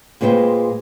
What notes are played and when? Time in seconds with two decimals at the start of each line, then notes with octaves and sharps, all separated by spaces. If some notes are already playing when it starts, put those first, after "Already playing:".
0.21 A#2 G#3 B4 C5 D5 G5